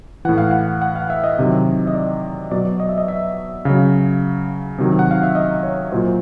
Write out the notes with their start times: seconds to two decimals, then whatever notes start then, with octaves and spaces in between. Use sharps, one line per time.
0.25 A2 E3 F#5
0.38 F5
0.51 F#5
0.82 F#5
0.96 F5
1.10 E5
1.24 D#5
1.39 C3 D#3 F#3
1.87 D#5
1.95 D5
2.51 B2 F#3 D5
2.80 D#5
2.89 E5
2.98 D#5
3.08 E5
3.65 C#3 F#3 F5
4.78 C3 D#3 F#3
4.99 F#5
5.11 F5
5.23 E5
5.35 D#5
5.63 C#5
5.92 A#2 F#3 C5